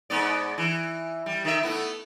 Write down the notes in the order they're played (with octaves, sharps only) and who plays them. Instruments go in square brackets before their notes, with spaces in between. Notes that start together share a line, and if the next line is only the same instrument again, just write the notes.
[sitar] G#2 B3 D5
E3
G3
D#3 E5
A3 B3 E4